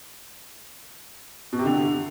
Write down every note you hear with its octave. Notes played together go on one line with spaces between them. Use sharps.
B2
C3
D3